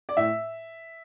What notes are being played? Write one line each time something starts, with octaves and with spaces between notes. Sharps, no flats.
D5
A2 E5